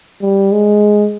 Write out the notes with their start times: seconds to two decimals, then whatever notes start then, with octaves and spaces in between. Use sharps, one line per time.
0.22 G3
0.52 G#3